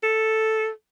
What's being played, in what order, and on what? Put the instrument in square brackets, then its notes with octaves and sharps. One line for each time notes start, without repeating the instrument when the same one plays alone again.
[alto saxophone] A4